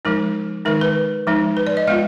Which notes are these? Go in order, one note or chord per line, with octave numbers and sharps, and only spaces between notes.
F3 G#3 D#4 A#4
D#3 G#3 D#4 A#4
B4
F3 G#3 D#4
B4
D5
D#5
G#3 B3 F4 F5